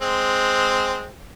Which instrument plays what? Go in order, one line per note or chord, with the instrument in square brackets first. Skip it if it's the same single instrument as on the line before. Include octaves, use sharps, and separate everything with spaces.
[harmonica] G#3 C4